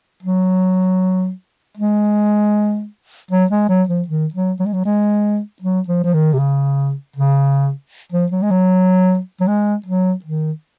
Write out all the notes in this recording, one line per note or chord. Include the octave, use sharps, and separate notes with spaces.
F#3
G#3
F#3
G#3
F#3
F3
D#3
F#3
F#3
G#3
F#3
G#3
F#3
F3
F3
D#3
C3
C#3
C#3
F3
F#3
G#3
F#3
F#3
G#3
F#3
D#3